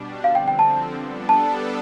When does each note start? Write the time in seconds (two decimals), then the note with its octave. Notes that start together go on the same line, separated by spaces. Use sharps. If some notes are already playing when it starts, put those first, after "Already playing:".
Already playing: B2 G3 D4
0.23 D3 F3 C4 F5
0.35 G5
0.48 G5
0.59 A5
0.93 G3 B3 D4 A4
1.29 A5